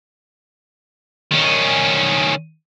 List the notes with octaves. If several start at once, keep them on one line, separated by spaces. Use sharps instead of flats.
D#3 C#4